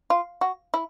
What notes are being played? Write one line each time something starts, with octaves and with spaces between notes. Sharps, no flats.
F4
F#4
E4